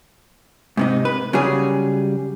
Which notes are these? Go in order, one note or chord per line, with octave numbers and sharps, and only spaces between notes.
G#2 C3 D#4
B4
C#3 F#3 G3 G#4